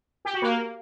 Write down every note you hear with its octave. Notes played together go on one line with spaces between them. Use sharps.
G4
F#4
A#3